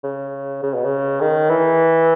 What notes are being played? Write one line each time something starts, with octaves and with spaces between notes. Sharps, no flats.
C#3
C#3
B2
C#3
D#3
E3